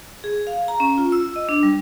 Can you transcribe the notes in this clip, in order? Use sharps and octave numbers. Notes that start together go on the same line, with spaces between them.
G#4
F5
A#5
C#4
F4
E6
D#5
D4
G3